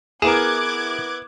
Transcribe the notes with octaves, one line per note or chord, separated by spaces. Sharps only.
B3 E4 G#4 A#4 D6 F#6 G#6 E7